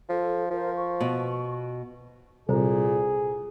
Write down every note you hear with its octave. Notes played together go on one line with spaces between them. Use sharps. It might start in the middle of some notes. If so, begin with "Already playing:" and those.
F3 A4
F3 A#4 C5
C#6
B2
C2 A#2 G#4 A4 C5 A#5